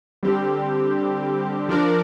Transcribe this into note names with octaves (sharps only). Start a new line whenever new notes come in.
D3 G3 C4 G4
F3 D4 A#4 D5